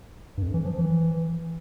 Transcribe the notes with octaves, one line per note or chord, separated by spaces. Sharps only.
G2
F2
E3
F3
E3